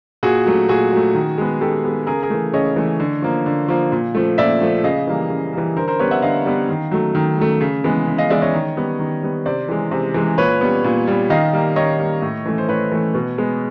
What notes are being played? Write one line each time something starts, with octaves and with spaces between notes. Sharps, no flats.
A#2 F#4 G#4
F#3 A3
A#2 F#4 G#4
F#3 A3
D#3
G#3 B3
D#3 G4 A4
G#3 B3
C#3 G#4 A#4
G#4 A#4
E3 A3
C#3 C#5 D#5
E3 A3
D3
F3 A#3
D3
F3 A#3
A#2
F3 A3
A#2 D5 E5
F3 A3
C#3 D#5 F5
E3 G3 A#3
C#3
E3 G3 A#3
D3 A#4 C5
A#4 C5
G3 B3 B4 C#5
E5 F#5
D3 D#5 F5
G3 B3
D#3
F#3 A3
D#3
F#3 A3
C#3
E3 G#3 B3
C#3
D#5 F5
E3 G#3 B3 D5 E5
C#5 D#5
D#3
G3 B3
D#3
G3 B3
C3 C5 D5
E3 G#3
C3
E3 G#3
A#2 B4 C#5
G3 B3
A#2
G3 B3
D#3 D#5 F5
G3 A#3
D#3 C#5 D#5
G3 A#3
A2
E3 A3
C5
A2 B4 C#5
E3 A3
B2
G#3 B3